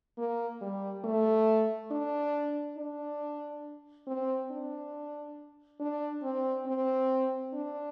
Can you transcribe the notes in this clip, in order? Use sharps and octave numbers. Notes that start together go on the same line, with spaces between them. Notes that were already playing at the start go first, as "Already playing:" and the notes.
A#3
G3
A3
D4
D4
C4
D4
D4
C4
C4
D4